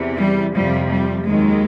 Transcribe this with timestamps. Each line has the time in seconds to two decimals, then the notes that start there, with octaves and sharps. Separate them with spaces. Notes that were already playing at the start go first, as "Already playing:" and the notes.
Already playing: E2 C3 E3
0.19 G3
0.56 F2 C3 F3 G3
0.91 G3
1.26 D#2 D#3 F#3 G#3